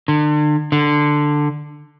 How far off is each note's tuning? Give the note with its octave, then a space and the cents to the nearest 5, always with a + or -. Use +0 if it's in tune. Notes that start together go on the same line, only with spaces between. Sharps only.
D3 +40
D3 +10